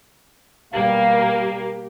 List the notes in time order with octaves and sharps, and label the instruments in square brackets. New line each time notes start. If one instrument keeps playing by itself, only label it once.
[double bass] B2 G3 [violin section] A#3 [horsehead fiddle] G4 [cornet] F5